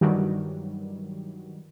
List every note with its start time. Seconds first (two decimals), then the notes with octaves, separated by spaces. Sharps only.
0.01 G2 D#3 E3 F#3 G3